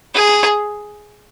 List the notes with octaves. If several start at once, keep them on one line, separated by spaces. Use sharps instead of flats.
G#4